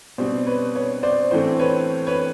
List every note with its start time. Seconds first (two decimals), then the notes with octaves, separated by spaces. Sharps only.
0.18 B2 G3 C4 C5
0.47 B4 C#5
0.75 B4 C#5
1.03 C5 D5
1.31 A2 E3 A3 C4 C5
1.59 B4 C#5
2.07 B4 C#5